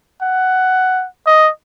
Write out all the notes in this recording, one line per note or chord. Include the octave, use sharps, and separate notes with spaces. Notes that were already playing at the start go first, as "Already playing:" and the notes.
F#5
D#5